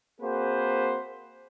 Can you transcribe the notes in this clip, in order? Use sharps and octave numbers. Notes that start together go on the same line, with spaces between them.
A#3 C4 F#4 G#4 B4 C5